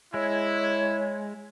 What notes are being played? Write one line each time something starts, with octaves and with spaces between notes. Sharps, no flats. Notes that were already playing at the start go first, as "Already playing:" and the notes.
G#3 E4 C#5